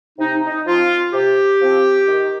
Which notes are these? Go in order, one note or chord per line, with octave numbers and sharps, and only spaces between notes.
C3 D#4
D#4
F3 C4 F4
C3 G4
F3 C4
D#3